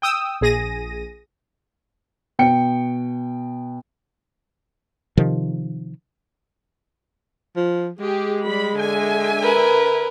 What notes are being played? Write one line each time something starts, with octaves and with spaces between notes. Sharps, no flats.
G5 D#6 E6
A#1 G#4 A#6 D#7
B2 G5 C#7
C3 D#3 F3
F3
G#3 G4 G#4
G3 B5
D3 E5 G#5
A#4 B4